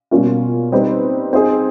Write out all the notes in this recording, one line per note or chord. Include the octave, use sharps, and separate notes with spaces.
B2 G3 A#3 C#4 F4
G3 C4 D#4 G4 B4
C4 D#4 G#4 C5